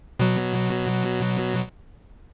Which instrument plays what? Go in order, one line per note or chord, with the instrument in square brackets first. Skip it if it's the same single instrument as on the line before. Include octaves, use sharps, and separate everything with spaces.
[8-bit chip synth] B2 F#3